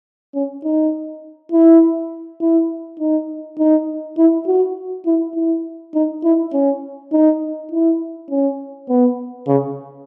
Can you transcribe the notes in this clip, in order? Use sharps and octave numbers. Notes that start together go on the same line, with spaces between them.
C#4
D#4
E4
E4
D#4
D#4
E4
F#4
E4
E4
D#4
E4
C#4
D#4
E4
C#4
B3
C#3